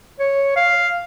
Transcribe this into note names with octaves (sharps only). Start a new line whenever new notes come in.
C#5
F5